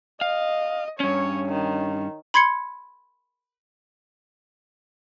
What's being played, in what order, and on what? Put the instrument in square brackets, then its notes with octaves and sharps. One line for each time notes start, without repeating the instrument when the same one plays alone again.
[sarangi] D#5 [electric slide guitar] F5
[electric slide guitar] G2 C#4 [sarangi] C#5
[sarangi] D#3
[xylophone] B5 C6 G#6 C7 C#7